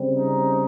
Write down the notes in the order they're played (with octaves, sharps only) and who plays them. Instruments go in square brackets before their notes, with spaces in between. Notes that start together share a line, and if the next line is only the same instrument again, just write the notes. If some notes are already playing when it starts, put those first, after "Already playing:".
Already playing: [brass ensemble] C#3 G3 C4
D#4